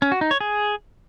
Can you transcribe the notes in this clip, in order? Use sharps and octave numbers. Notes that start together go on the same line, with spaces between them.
C#4
F#4
D#4
C#5
G#4